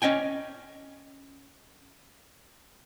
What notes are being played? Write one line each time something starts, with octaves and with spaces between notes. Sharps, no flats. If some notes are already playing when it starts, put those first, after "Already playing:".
C#4 D#5 G5 G#5